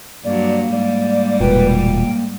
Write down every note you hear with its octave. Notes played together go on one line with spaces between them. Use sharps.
G2 F#3 A#3 D5
G#2 G3 D5
E1 A#2 B4 G5
A#3